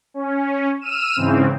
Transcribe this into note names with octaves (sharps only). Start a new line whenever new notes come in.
C#4
E6 F6 D#7 E7
G#2 C#3 E3 C4